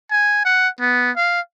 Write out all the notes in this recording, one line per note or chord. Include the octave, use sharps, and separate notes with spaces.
G#5
F#5
B3
F5